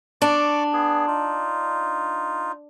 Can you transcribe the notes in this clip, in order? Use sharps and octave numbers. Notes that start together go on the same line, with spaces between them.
D4 D5 C#6 D6
B3 G#4
D#4 F4